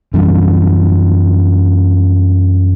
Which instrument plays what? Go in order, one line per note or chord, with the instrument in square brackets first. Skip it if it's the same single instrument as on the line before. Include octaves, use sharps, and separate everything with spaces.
[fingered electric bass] F#2 E3 G3 D4